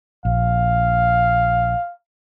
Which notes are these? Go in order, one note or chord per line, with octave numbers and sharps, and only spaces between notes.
A#1 F5